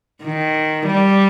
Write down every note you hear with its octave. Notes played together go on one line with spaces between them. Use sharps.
D#3
G3